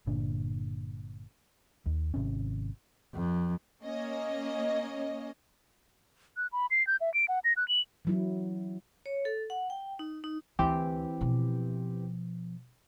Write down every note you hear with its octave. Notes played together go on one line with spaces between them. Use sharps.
G1 A#2 D3 D4
D#2
G#1 C3 C#4
F2
A#3 C#4 D#5
F#6
B5
C7
G6
E5
D7
F#5
A#6
F#6
F#7
E3 F#3 E4
C#5
A4
F#5
G5
D#4
D#4
D2 E3 C4 G4
B2 F3